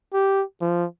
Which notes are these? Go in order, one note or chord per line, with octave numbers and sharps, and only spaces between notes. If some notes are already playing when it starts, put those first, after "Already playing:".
G4
F3